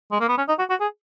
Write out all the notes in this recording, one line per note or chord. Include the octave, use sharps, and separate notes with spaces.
G#3
A#3
B3
C#4
D#4
F#4
F#4
G#4